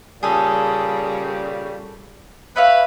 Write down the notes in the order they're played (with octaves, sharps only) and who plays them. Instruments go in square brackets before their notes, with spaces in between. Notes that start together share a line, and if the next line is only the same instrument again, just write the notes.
[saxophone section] A#2 C#3 G3 [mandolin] G#4 A4
[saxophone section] B4 [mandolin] C#5 E5 F5